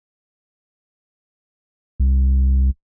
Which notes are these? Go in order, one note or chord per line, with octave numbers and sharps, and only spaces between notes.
C2